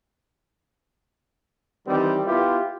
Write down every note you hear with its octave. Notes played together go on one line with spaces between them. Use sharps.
D#3 E3 G3 C4
B3 E4 F4 G4